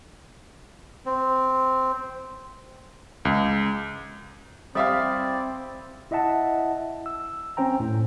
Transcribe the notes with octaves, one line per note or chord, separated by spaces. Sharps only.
C4
C#2
G3 C4 E4 D5 E5 F5 D6 D#6
E4 D#5 E5 F#5 A5
E6
C4 C#4 C5 G5 A#5
A2